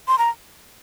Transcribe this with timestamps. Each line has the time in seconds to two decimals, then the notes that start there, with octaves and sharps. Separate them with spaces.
0.08 C6
0.18 A#5